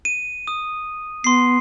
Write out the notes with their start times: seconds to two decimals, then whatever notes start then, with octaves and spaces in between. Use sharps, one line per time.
0.05 D#7
0.47 D#6
1.24 B3 C6 C7